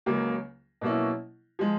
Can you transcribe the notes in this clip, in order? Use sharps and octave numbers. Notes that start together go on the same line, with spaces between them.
C#2 C#3 F#3 A#3 C#4
B2 F#3 A#3 C#4 E4
F3 G#3